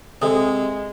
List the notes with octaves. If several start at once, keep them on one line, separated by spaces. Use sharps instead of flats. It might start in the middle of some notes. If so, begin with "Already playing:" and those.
C3 G#3 A4 D#6